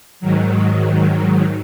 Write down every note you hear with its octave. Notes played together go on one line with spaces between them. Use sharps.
G#2 D#3 F#3